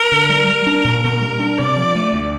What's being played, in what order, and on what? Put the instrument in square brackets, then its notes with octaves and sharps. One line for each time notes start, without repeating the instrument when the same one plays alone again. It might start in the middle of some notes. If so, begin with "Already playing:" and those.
Already playing: [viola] A#4
[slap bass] D3
G3
G3
D4
A#2
[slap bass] A#2 [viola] A#4
[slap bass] G3
D4
[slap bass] C3 [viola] D5
[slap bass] F3
A3
D2